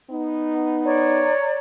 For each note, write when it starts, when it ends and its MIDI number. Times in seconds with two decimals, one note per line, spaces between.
0.11 1.31 59
0.11 1.31 63
0.85 1.59 73
0.85 1.59 74
0.85 1.59 82